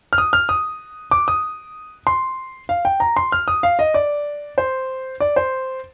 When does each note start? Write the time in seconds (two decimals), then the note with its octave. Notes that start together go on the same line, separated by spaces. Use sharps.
0.13 F6
0.18 D#6
0.33 F6
0.49 D#6
1.11 D6
1.28 D#6
2.07 C6
2.69 F5
2.85 G5
3.00 A#5
3.17 C6
3.32 F6
3.48 D#6
3.63 F5
3.79 D#5
3.94 D5
4.58 C5
5.20 D5
5.36 C5